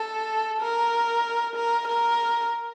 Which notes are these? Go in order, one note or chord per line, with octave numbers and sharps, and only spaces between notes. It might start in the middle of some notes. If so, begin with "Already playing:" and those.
Already playing: A4
A#4
A#4
A#4